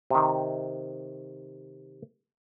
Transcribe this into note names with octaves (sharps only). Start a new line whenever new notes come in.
C3 D#3